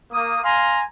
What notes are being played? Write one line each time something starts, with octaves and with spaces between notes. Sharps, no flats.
A#3 D#6
F5 G#5 A#5 C6